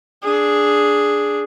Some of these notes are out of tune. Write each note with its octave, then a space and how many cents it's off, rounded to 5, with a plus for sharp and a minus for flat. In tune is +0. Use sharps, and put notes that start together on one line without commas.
D4 -5 G#4 +0